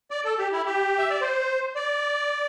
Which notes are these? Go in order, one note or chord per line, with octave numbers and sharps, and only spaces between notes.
D5
A4
G4
E4
G4
E5
D5
C5
D5